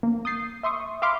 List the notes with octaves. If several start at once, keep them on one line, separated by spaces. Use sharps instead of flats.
A#3
D#6 G6 A6 C7
E5 C6 C#6 D#6
E5 F5 B5 C6 D6 F6